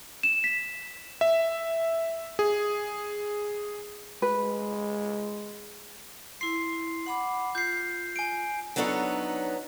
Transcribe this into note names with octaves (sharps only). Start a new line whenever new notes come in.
E7
B6
E5
G#4
G#3 B4
E4 C6 C7
F#5 B5 D6
F4 G6 C7
G#5 D7
F#3 B3 D4 D#4 A4 C#5